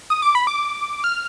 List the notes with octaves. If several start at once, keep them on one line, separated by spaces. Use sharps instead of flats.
D#6
D6
B5
D6
F6